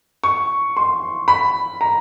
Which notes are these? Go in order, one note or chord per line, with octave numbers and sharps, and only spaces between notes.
C#6
C6
B5
A#5